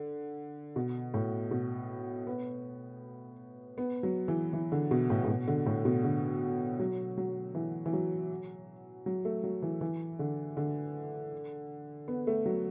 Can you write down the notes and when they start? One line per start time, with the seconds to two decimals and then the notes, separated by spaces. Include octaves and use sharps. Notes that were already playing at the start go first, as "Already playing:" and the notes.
Already playing: D3
0.76 B2
1.14 A2
1.51 B2
2.27 B3
3.78 B3
4.03 F#3
4.28 E3
4.53 E3
4.72 D3
4.91 B2
5.10 A2
5.24 A2
5.28 B2
5.47 D3
5.66 A2
5.85 B2
6.04 D3
6.80 F#3
7.18 F#3
7.55 E3
7.86 E3
7.93 F#3
9.06 F#3
9.25 A3
9.44 F#3
9.62 E3
9.81 E3
10.19 D3
10.57 D3
12.08 B3
12.27 A3
12.46 F#3